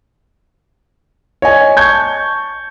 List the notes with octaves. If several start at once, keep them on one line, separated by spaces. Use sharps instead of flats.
C#5 D#5 G#5
A5 C#6 G6 G#6